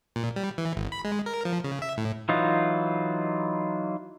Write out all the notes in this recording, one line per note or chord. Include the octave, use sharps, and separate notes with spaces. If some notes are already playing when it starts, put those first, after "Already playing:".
A#2
G3
E3
G#1
B5
G#3
A#4
F3
C#3
E5
A2
E3 F#3 D#4 F4